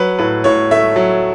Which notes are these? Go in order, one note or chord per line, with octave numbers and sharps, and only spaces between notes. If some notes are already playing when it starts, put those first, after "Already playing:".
Already playing: F#3 B4
A2 B4
A2 C#5
A3 E5
F#3